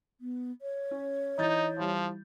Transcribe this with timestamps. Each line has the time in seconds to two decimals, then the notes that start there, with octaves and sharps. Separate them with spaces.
0.21 B3
0.62 C#5
0.91 C#4
1.38 E3 D#4 G6 A6
1.78 E3 F3 G3